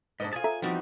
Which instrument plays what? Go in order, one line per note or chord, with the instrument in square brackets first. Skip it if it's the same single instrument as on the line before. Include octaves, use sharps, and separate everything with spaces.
[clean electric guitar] G#2 [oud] D4 C5 D#5
[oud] F4 G#4 [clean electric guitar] G#5 A5
[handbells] A4 E5 A#5
[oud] E2 E3 G3 [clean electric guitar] F3 [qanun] C4 D#4 F#4